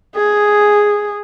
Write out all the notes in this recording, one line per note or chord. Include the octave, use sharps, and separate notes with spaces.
G#4